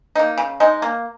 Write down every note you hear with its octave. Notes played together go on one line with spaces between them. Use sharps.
A#3 D#4
C#3
G#3 D#4
A#3